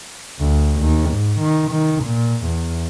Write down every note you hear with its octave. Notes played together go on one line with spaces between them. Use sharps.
D2
D#2
G#2
D#3
D#3
A#2
E2